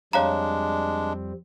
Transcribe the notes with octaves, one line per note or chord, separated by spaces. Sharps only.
F2 G3 G#3 C4 D4 C#5 F5 A#5